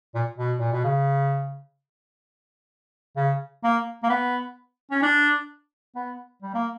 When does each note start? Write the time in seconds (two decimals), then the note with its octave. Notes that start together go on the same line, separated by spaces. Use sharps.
0.15 A#2
0.38 B2
0.59 A#2
0.72 B2
0.84 C#3
3.16 C#3
3.64 A#3
4.03 A#3
4.10 B3
4.91 C#4
5.03 D4
5.96 B3
6.42 G3
6.54 A#3